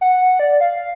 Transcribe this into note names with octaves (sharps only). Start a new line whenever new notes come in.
F#5
D5
F5